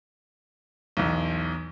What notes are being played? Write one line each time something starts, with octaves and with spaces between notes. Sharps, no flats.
B1 E2